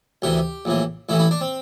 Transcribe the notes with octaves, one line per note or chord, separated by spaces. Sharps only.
D2 C3 E3 G4
A#1 A2 E3
A1 A2 E3 E4
E4
D4
C4